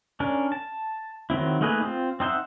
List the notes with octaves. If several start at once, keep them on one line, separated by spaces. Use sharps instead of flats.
C#4 D4 A#4
A5
D#3 F#3 C4 E4
A3 A#3 D#4 G#4 B4
C4 F4
C4 D#4 C5 E5 F#5